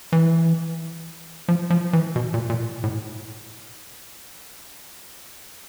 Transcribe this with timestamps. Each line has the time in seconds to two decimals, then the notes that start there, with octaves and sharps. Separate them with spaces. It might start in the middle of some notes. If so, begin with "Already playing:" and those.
0.12 E3
1.48 F3
1.70 F3
1.93 E3
2.16 B2
2.34 A#2
2.50 A#2
2.84 A2